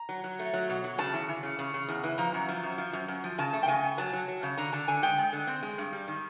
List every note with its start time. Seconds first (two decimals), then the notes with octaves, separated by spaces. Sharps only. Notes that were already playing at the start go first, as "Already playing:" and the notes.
Already playing: A#5
0.09 F#3
0.24 F#3
0.39 A3
0.53 F#3
0.69 B2
0.84 F#3
0.98 C#3 A5
1.13 E3
1.29 E3
1.43 C#3
1.59 C#3
1.74 C#3
1.88 E2
2.03 E3
2.18 F3 A#5
2.34 F#2
2.49 F3
2.63 F#2
2.78 F3
2.93 F#2
3.08 F#2
3.24 F3
3.38 C#3 A5
3.53 A3
3.63 G5
3.68 C#3 G#5
3.83 C#3
3.98 F#3 A5
4.13 F#3
4.28 F#3
4.43 C#3
4.57 D3 A#5
4.73 D3 A5
4.88 D3 G#5
5.03 G#3 G5
5.18 G#3
5.33 D3
5.47 C4
5.62 G#3
5.78 G2
5.93 G3
6.08 D#3